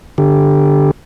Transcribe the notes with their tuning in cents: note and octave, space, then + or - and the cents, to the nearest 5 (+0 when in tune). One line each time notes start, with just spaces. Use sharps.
D3 +0 G4 +0